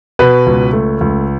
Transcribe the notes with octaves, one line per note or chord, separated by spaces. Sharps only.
B2 B4
C#2
A3
C#2